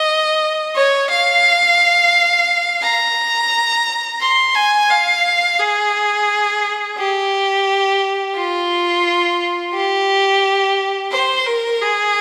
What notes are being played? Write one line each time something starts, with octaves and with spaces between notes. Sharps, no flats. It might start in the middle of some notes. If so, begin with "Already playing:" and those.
Already playing: D#5
C#5
F5
A#5
C6
G#5
F5
G#4
G4
F4
G4
C5
A#4
G#4